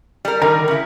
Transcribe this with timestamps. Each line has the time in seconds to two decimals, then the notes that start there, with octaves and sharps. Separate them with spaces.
0.25 G3 A#4
0.42 D3 D#3 G3 A#4
0.68 C#3 E4